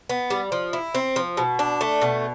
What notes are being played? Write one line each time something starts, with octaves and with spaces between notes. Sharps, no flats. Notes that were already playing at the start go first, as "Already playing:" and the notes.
B3
G3
F3
E4
C4
F3
B2
D4
A3
B2